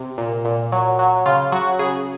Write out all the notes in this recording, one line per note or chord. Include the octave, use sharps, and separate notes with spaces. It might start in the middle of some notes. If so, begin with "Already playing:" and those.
Already playing: C3
A#2
A#2
F#3
F#3
C#3 F4
F#3 F#4
C#3 G#4